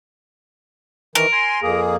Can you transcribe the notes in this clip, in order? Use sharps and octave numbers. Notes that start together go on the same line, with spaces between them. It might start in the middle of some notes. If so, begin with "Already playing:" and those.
D#3 E3 A#4
G#5 C6
F2 A#3 G#4